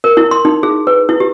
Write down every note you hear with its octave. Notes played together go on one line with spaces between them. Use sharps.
A#4
E4
C6
D#4
G#4
B4
E4
G4